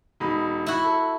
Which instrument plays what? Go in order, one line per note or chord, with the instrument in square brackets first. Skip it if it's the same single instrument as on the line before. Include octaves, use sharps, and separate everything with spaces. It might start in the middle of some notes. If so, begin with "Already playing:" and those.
[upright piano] E1 D#4 B5
[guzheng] E4 F#4
[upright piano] A4